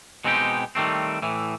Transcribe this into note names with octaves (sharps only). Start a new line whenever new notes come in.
B2 G#3 C4 D#4 F#4 G4
D#3 G3 A3 C4
A2 E3